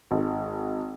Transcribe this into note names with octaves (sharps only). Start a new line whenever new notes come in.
G#1